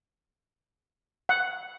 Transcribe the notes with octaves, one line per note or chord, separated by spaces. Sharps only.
F#5